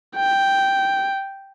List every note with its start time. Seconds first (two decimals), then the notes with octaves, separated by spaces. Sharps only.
0.16 G5